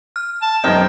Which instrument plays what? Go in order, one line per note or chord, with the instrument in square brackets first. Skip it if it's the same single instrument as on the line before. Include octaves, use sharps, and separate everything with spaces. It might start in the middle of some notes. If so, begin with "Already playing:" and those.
[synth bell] F6
[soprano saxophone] A5
[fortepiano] B1 F#2 [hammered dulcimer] C3 D#4 A#4 [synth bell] D#5 [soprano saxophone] G5